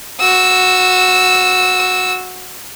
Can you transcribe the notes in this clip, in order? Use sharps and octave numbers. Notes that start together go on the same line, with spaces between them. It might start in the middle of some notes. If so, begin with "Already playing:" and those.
F#4 E6